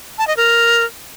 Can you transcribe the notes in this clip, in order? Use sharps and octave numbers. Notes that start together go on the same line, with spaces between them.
A5
D#5
A#4